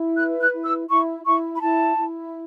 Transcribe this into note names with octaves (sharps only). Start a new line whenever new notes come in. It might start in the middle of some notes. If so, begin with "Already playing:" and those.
Already playing: E4
B4 F#6
F#6
E4
E6
E4 C#6
E4 C#6
B5
E4 A5
E4